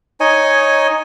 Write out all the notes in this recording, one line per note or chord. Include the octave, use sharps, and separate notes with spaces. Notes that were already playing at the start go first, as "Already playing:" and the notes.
D#4 C#5 D#5 G#5